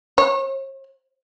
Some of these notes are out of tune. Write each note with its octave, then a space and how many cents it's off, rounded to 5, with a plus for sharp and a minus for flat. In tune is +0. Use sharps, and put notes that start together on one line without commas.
C#5 -45